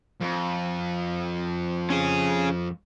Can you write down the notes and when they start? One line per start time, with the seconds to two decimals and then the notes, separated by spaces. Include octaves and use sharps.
0.21 F2
1.90 C#4 G#4